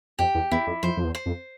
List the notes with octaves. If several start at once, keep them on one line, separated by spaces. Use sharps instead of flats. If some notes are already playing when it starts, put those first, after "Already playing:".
F2 G4
E2
E2 E4
F2
F2 C5
F2
E2
C5
F2